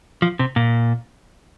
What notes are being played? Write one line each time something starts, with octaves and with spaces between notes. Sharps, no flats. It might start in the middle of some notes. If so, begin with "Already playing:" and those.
F3
C3
A#2